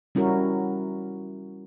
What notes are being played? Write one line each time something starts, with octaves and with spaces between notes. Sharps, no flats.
G3 C#4 E4 F#4 A#4